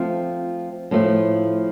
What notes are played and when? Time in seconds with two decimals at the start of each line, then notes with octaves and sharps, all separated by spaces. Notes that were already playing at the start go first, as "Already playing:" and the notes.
Already playing: F3 A3 C4 F4
0.91 A2 F3 A3